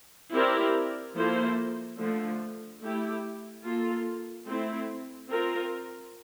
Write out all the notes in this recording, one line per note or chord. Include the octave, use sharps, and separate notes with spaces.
C4 E4 G4 A#4 D5
F3 A#3 E4 A4 C5
D3 F3 A3
A3 E4 G4
A#3 F4 A4
A3 C4 E4
C4 F4 A#4